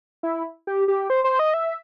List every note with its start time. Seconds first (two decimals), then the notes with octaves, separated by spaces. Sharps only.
0.23 E4
0.67 G4
0.88 G4
1.10 C5
1.24 C5
1.39 D#5
1.54 E5